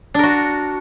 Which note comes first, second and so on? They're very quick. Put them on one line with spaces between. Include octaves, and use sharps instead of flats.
D4 A#4 F#4